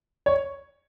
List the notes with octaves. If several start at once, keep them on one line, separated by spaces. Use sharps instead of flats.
C#5